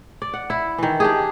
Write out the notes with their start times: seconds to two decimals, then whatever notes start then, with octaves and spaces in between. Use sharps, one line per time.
0.22 D5
0.34 F#5
0.50 E4
0.78 D#3 E3
1.00 D4 G4 G#4